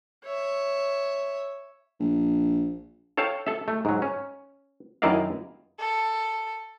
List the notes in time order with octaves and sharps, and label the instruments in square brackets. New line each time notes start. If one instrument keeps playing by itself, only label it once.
[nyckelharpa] C#5 E5
[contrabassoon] A#1
[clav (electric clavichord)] A4 C#5 F5 G5 A5
A4 E5
A3
G#2 F#3
C#4
F#2 D#3 E4 D5 D#5 F5
[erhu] A4